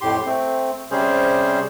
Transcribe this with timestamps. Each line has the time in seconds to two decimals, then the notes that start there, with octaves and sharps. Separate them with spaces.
0.01 F2 A2 G4 C6
0.26 A3 C4
0.91 C3 G3 C#4 G#4 C5